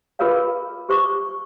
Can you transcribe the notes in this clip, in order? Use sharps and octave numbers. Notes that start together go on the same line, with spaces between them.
F4 G#4 A#4 B4 C#5 F5
G4 C5 C#6 D6